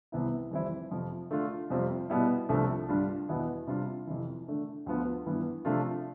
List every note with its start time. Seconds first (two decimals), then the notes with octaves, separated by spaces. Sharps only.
0.12 C2 C3 E3 B3 E4
0.51 F2 E3 G3 C4 E4
0.91 F2 C3 F3
1.30 D3 A3 D4 F4
1.70 F2 C3 G3 C4 F4
2.10 B2 G3 B3 E4
2.49 C2 C3 F3 A3 D4
2.89 G2 D3 G3 D4 F4
3.29 E2 B2 B3 E4
3.67 C3 G3 D4 F4
4.07 F2 C3 E3
4.47 D3 A3 D4
4.86 D2 D3 F3 B3 F4
5.26 G2 E3 B3
5.65 C3 F3 A3 D4 F4